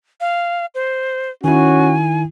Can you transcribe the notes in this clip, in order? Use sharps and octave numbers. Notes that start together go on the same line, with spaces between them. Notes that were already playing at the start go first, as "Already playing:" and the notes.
F5
C5
D#3 C#4 E4 F#4 G#5